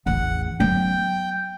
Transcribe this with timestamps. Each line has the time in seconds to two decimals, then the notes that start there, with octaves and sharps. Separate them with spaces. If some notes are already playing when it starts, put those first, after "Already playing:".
0.06 A1 E2 F#5
0.60 F#3 B3 G5